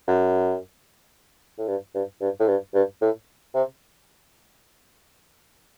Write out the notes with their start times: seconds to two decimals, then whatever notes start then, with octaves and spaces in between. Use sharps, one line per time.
0.08 F#2
1.58 A2
1.68 G2
1.95 G2
2.21 G2
2.39 A2
2.48 G2
2.74 G2
3.02 A2
3.54 C3